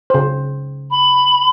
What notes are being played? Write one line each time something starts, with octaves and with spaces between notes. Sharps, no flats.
C#3 C5
B5